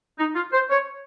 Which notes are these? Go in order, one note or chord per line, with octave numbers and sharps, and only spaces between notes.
D#4
F4
C5
C#5